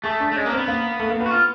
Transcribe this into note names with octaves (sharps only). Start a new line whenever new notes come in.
A3 G#4
D4
A3
G#3 C#4
A#3
C4
B3
A#3
A3
A#3
B3
F#4
F4